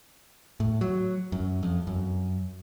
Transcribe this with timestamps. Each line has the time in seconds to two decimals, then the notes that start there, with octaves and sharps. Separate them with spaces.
0.60 A2
0.81 F#3
1.32 F#2
1.63 F2
1.87 F#2